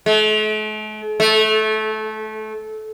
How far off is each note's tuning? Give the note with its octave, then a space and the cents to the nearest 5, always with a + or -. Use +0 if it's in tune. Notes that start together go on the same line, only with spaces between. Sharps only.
A3 -45
A3 -20